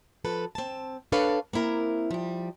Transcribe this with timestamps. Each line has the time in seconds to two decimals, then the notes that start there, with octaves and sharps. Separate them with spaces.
0.25 F3 A4 B4
0.55 C4 A5
1.12 D4 A4 B4 C#5 F5
1.53 A#3 C4 E4 A#4
2.11 F3 G3